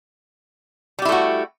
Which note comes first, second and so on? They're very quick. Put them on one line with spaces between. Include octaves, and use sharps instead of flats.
G3 G4 E4 A3 F#4